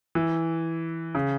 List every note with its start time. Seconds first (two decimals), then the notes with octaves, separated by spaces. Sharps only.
0.15 E3
1.15 C#3